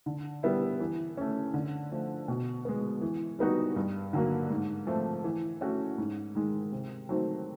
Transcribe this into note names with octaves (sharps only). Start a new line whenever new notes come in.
D3
G3 B3 E4
E3
A3 C#4
D3
F3 A3
B2
G#3 B3
E3
G3 B3 D#4 F#4
G2
D3 F#3 A#3
G#2
F3 A3 C4
E3
A3 C#4 F#4
G#2
D#3 G#3
C3
D#3 F#3 A3 C4